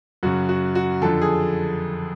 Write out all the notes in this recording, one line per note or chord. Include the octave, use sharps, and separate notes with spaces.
F#2 C#3 F#4
F#4
F#4
F2 D3 A4
G#4